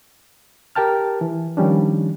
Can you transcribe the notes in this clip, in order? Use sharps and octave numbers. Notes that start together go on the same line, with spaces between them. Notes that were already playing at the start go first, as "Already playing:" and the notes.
G4 A#4 G5 A5 F6
E3
D#3 F3 G3 C#4 D4